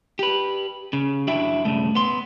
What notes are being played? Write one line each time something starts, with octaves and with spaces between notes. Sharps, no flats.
G4 B4
C#3
F#2 D4 E4 F#4 E5 G5
B1 G2 C#3 A3
B3 C6